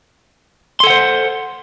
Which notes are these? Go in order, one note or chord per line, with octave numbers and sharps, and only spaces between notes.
A4 C5 F#5 C6